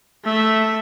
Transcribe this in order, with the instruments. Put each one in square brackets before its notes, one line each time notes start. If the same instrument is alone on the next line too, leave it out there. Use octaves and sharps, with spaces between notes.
[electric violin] A3 E5